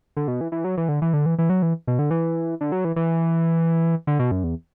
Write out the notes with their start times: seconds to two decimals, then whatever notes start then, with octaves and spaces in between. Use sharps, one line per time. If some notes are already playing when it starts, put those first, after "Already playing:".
0.16 D3
0.28 B2
0.41 E3
0.52 E3
0.64 F#3
0.77 E3
0.89 D3
1.02 E3
1.13 D3
1.26 E3
1.38 E3
1.50 F#3
1.62 E3
1.87 B2
1.99 D3
2.11 E3
2.61 D3
2.72 F#3
2.85 E3
2.96 E3
4.07 D3
4.19 B2
4.31 F#2
4.44 E2